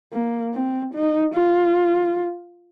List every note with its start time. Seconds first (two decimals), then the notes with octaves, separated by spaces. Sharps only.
0.13 A#3
0.54 C4
0.94 D#4
1.35 F4